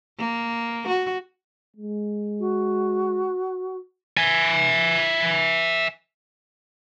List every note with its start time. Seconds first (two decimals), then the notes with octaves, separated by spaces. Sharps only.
0.19 A#3
0.88 F#4
1.76 G#3
2.39 F#4
4.17 E5 G#5